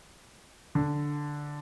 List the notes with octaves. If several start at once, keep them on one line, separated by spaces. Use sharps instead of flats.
D3